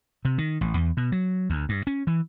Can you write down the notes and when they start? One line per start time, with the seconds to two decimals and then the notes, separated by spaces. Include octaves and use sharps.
0.25 C3
0.38 D#3
0.61 A1
0.77 E2
0.97 B2
1.12 F#3
1.50 D2
1.69 G2
1.87 C#4
2.07 E3